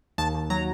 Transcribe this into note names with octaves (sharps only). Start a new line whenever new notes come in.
D#2 A5
D#2
F#3 A#5